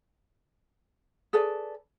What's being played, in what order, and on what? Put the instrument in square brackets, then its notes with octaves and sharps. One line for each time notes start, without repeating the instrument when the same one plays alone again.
[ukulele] G#4 A4 B4 D5